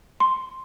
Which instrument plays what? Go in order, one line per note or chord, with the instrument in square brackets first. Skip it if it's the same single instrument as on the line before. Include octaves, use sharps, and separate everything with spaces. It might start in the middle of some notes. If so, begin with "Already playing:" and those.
[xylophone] C6